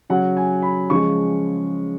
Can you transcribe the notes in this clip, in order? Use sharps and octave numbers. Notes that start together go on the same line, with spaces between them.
C#3 F#3 F#5
G#5
B5
C#3 F3 G#3 C#6